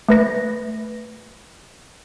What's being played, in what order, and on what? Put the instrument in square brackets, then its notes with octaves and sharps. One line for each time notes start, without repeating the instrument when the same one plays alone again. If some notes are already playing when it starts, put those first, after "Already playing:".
[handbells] A3 B4 A#6